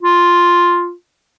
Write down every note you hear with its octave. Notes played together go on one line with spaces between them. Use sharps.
F4